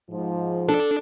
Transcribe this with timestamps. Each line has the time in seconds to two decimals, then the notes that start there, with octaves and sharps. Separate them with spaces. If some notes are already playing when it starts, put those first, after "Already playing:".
0.11 G#2 F3
0.69 D4 A4